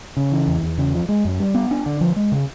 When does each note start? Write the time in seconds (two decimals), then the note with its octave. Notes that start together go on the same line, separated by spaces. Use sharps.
0.17 C#3
0.32 E3
0.48 E2
0.63 E2
0.78 C#3
0.94 F3
1.09 G#3
1.25 F#2
1.40 G3
1.55 B3
1.71 D4
1.86 D3
2.01 F3
2.16 G#3
2.32 C#3